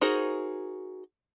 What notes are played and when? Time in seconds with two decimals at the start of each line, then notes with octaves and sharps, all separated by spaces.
0.01 D#4 F#4 G#4 A#4 C5